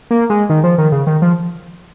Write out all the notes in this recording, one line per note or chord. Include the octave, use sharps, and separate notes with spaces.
A#3
G#3
D#3
F3
D#3
C#3
D#3
F3